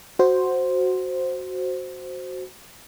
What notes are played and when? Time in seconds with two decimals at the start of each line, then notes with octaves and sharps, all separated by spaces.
0.19 F#4 C5